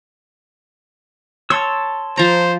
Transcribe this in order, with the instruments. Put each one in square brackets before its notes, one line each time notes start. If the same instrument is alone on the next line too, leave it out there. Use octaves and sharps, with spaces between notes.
[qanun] C#5 [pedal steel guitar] A5 C6 E6
[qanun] F3 A#5 [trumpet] C5